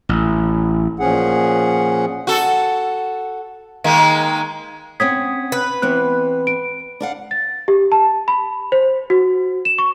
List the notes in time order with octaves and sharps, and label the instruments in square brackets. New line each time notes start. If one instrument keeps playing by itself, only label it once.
[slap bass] A1
[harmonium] A#2 F3 C#4 G#4 F#5
[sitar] F#4 A4
D#3 G#3 A#3
[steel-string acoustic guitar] C4 C#4 F#5 [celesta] D#6 G#6 B6
[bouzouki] B4
[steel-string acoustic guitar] E3 B3 C4 [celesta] F#6
[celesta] D7
[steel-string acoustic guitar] D4 F5 F#5
[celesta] A6
G4
A5
B5
C5
F#4
E7
C#6